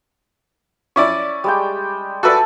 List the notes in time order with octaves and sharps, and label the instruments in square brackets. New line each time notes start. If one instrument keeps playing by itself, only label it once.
[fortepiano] C#4 E4 D5 [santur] C#6 D6
[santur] G3 G#3 G5
[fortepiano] F#4 B4 D5 [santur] A4 E5 A5